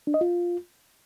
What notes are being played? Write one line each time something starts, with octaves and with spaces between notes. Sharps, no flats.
D4
D#5
F4